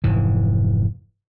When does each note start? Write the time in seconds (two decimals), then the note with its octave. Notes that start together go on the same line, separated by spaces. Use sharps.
0.04 F1 G#2 E3